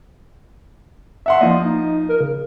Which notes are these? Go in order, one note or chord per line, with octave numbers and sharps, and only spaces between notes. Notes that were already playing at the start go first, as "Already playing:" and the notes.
E5 F#5 C6
F3 A#3 D#5
D#4
A#4
C#3